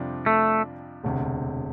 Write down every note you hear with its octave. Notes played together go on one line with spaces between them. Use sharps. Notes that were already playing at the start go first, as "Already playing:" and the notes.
Already playing: F2 C3 G3 D4 F4
A3
E1 D2 C3